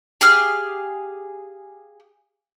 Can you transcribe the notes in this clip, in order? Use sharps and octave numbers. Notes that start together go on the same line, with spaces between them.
G4 G#4 F5 F6